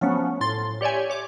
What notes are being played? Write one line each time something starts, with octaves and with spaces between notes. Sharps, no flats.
F3 F#3 A3 B3 C#4
A2 C6 A6
G4 C#5 D5 E5 G#5
C#5 D6